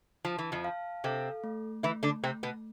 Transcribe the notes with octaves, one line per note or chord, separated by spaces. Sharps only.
F3 A5
E3
F2 F3
F5
C3 C4 A4
A3
E3 A3 E4
D3 D4
C3 A3 C4
B2 B3